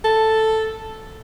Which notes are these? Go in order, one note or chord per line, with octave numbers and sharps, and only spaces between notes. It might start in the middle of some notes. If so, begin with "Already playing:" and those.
A4